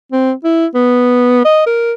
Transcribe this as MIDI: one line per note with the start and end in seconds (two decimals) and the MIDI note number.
0.12 0.33 60
0.45 0.66 64
0.75 1.43 59
1.45 1.65 75
1.67 1.94 70